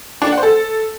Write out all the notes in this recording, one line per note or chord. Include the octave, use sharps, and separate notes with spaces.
D4
D5
F#5
C5
A4